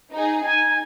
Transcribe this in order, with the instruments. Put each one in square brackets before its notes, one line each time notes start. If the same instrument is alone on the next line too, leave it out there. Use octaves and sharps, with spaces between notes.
[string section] D#4 G#4
[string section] D#4 [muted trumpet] G#5